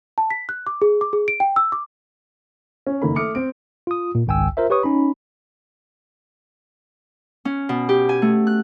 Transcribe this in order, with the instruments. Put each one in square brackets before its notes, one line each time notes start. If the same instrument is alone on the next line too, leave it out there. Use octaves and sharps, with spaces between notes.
[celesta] A5
B6
F#6
D6
G#4
D6
G#4
D7
G5
E6
D6
[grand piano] C#4
F#1 D#3 A#3 A4 B5
A3 D6 D#6 F6 C#7 D7
C4 D7
[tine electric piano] F4 D#6
A#2
G#1 C#2 G5 G#5 E6
F4 A#4 C5 E5
G4 B4 C#5 C#6 D#6
C#4 D#4 B5
[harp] C#4
B2
G4
G#5
A3
F#6